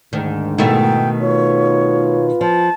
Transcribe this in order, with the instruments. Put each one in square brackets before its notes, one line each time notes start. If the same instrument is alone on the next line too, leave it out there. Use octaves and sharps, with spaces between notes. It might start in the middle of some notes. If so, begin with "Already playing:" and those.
[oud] D2 D#3 [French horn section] G#2
[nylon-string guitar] B2 D#3 [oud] A3 D#4 E4 [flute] G5
[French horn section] F4 B4 [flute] C#5
[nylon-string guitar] F3 [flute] A5